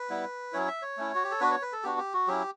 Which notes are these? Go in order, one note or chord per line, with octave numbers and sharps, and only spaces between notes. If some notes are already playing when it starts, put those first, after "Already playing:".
Already playing: B4
G3 B3 E4
F#3 C#4 E4 C#5
E5
C#5
A3 C#4 E4
F#4
G4
A4
B3 D4 F#4 B4
C#5
B4
A4
B3 D4 F#4 G4
G4
F#4
F#3 C#4 E4 G4